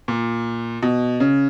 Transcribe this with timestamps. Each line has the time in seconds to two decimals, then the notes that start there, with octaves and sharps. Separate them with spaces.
0.08 A#2
0.83 B2
1.20 C#3